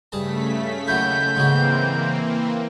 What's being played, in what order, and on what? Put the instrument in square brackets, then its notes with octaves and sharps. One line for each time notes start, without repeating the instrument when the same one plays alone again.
[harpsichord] G2 G#4 A5 [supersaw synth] C#3 A3 B6
[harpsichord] D#2 F#3 E4 [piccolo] G6
[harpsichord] G#2 C#3 F#3 [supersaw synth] E3 A#3 C4